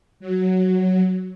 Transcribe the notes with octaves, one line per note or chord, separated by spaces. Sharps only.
F#3